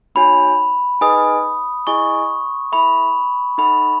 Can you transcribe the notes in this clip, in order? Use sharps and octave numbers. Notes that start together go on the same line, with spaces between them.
B3 D#4 F#4 C#5 G#5 B5
D#4 G#4 B4 D#5 G#5 D#6
E4 G#4 D#5 G#5 C#6
E4 A4 E5 B5
D#4 A4 D#5 F#5 A5 B5